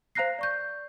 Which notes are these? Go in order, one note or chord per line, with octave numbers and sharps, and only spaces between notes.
C5 F5 A#5 F#6 A#6 C7
D5 C#6 G6